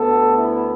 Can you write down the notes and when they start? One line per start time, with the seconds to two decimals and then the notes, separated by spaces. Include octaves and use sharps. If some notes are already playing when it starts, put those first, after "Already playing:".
Already playing: D2 D3 B3 A4
0.35 E4